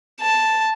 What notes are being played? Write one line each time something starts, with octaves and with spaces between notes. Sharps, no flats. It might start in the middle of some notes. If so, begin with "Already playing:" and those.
A5